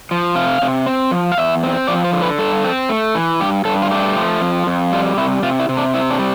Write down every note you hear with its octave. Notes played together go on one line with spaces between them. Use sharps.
F3
C3 F5
C3
C4
F3
F5
E2 E5
C4
F3 D5
C5
D3
B4
G2 A4
C4
A3
E3
G2 G4
G2 A4
F4
A3 G4
F3
F2
F2
G3 F4
C3 E4
C3 F4
E4
C3
D4
C4 E4
D4
G3